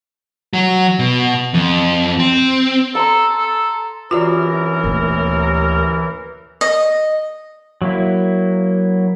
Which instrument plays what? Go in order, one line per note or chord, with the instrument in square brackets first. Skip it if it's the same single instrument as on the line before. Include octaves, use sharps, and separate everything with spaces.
[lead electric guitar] F#3
B2
F2
C4
[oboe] A4 [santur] A#5 C6
[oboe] A4
[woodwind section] C2 F#2 A#4 [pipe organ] E3 [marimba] F4 F#4 D5
[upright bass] D2 A#2
[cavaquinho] D#5
[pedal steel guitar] F#3 A#3 E4